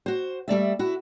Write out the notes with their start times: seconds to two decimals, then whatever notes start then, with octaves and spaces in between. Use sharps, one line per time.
0.06 F#4 C5
0.48 G3 A3 D5 E5
0.79 E4 F#4